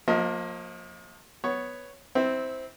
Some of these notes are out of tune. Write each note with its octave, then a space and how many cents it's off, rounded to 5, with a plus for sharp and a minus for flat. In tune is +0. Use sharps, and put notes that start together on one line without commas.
F3 +35 A#3 +0 D#5 +30
B3 +5 C#5 +0
C4 +0 E4 -25